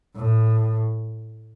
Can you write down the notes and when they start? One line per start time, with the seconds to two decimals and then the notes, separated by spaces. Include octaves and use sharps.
0.16 A2